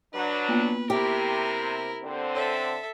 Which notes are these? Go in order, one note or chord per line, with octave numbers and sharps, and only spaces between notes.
F#3 D4 B4
A#3 B3 F4
C3 E4 G4 A#4
D3 C4
A4 C#5 E5